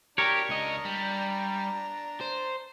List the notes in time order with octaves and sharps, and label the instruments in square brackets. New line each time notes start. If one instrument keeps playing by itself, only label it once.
[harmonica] D4 A#5 [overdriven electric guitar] G4 [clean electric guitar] A#4 C#5
[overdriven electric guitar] C#2 D#5
G3
C5